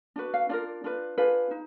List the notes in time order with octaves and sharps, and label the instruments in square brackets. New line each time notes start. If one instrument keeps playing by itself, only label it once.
[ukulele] D4 F#4 B4
F5
D4 F4 A#4 D5
D4 F4 B4
D4 F4 G#4 B4
D#4